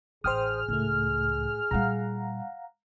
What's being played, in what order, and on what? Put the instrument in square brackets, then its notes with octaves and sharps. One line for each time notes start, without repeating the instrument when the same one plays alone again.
[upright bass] A1 [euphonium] G#4 [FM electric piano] C5 G5 D#6 [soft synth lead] F6
[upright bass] C#2 [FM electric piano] A2 A3
[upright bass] A#2 G3 [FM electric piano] F5 F#5 A#5